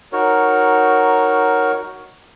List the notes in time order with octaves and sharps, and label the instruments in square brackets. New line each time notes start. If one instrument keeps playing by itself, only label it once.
[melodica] D#4 F#4 A#4 C#5